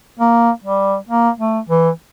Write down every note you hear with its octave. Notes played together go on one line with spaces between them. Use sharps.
A#3
G3
A#3
A3
E3